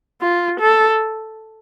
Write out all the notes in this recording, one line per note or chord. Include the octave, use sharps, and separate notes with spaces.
F4
A4